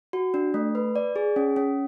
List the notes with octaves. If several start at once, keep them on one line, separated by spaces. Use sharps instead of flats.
F#4
D4
A3
B4
D5
G#4
C#4
C#4